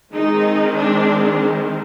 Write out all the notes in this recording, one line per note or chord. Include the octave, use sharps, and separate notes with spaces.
D#3 G#3 C4 D#4
D4